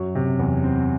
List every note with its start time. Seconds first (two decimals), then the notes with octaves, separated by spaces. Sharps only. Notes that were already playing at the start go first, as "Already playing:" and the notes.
Already playing: F#2 F#3
0.15 C3
0.39 E2
0.64 C4